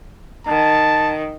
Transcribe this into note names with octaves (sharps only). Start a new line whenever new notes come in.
D#3 A5